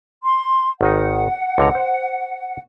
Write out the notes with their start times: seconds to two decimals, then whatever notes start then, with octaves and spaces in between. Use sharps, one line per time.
0.23 C6
0.81 G#1 D#3 D#4 F#5
1.58 C#2 D3 A#5
1.75 C5